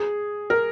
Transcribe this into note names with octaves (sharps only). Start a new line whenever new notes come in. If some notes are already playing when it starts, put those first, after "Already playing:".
Already playing: G#4
A#4